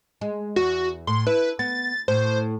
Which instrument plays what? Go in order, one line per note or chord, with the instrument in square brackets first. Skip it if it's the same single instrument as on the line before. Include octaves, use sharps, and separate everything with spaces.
[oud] G#3
[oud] E2 [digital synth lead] F#4
[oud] A2 [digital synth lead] C6
[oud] E4 [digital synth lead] B4
[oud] B3 [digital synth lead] A6
[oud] A2 [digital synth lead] C5